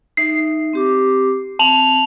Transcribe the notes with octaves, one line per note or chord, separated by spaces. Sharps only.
D#4 E5 C7
C4 G4 D6
C4 A5 F7 F#7